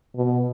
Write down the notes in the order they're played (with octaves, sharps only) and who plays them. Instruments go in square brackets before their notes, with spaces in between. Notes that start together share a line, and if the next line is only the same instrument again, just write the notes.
[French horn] B2